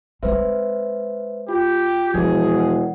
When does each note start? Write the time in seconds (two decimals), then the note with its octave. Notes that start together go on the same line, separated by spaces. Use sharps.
0.23 G#3 C4 B4 C5 E5
1.49 F4 G4
2.14 E1 F3 B3 G#4 G#6
2.55 F#5